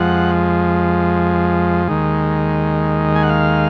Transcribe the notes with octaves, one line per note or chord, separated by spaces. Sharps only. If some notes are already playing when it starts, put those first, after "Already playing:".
Already playing: F2 F3 G#3 F#5
D#2 D#3 G#3
G#5
F#5
F5